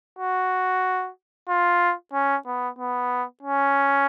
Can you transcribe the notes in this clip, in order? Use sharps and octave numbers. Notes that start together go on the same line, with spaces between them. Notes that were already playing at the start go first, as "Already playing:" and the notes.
F#4
F4
C#4
B3
B3
C#4